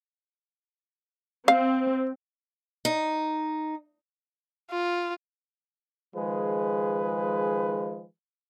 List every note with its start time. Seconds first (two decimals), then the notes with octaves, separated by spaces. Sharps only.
1.48 C4 F5
2.85 D#4
4.71 F4
6.15 D#3 F3 G#3 G#4 B4